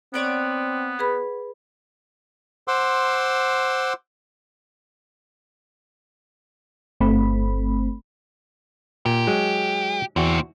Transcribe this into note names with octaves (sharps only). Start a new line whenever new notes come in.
B3 C4 C#5 D5 F#5
G#4 B4 B5
C5 F#5 C6 D6 E6
G1 A3 C4 B5
A#2 G4
F#3 G#3
E2 A#2 C4 F#4